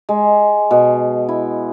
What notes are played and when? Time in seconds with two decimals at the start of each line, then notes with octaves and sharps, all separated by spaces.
0.09 G#3
0.71 B2
1.29 E4